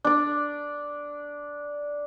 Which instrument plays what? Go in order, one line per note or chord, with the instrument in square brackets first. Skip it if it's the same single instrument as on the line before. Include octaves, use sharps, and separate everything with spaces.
[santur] D4 D5